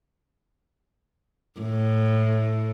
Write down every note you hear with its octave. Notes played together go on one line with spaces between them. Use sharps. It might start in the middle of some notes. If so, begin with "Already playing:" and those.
A2